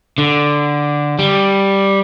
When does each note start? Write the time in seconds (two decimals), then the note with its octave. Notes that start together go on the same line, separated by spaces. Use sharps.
0.18 D3
1.19 G3